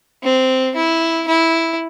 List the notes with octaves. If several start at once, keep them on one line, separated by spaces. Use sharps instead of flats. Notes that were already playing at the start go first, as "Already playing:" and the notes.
C4
E4
E4